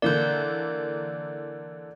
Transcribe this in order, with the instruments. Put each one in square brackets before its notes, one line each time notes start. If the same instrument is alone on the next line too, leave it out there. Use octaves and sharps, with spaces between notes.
[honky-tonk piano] D3 E3 A#3 [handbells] D5 G6